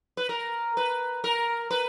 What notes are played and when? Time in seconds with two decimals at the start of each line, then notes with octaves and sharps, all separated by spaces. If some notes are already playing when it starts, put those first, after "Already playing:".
0.17 B4
0.29 A#4
0.77 B4
1.24 A#4
1.71 B4